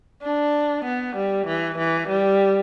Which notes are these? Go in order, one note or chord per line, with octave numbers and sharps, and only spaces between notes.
D4
B3
G3
E3
E3
G3